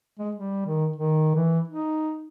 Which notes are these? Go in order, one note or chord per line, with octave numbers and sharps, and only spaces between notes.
G#3
G3
D#3
D#3
E3
D#4